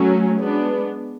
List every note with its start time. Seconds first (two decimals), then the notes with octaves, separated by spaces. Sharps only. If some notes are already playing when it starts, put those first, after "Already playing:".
Already playing: F#3 A3 C#4
0.37 G#3 B3 D4